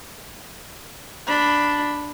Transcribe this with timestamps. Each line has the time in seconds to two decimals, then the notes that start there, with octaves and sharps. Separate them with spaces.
1.27 D4 B5